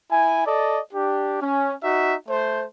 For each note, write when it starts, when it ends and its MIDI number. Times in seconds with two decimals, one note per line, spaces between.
0.10 0.45 64
0.10 0.45 80
0.46 0.79 69
0.46 0.79 74
0.46 0.79 75
0.93 1.40 62
0.93 1.40 67
1.42 1.74 61
1.83 2.15 63
1.83 2.15 66
1.83 2.15 76
2.28 2.64 57
2.28 2.64 72